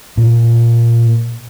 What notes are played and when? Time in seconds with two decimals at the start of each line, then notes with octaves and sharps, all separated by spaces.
0.17 A#2